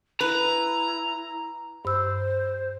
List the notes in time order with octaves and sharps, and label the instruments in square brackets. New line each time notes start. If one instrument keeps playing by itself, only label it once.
[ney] E4 [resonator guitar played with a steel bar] B4 [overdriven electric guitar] A#5
[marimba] G2 E6 [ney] C5